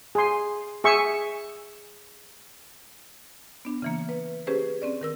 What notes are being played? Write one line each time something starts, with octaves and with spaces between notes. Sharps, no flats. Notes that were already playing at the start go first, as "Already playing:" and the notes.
G#4 C6
G#4 E5 C#6
B3 D4
C#3 E3 A#3
B4
C#4 G4 G#4 B4 C5
C4 C#4 D5
D#3 A#4 E6